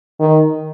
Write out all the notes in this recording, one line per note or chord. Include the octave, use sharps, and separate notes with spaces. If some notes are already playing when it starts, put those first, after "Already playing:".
D#3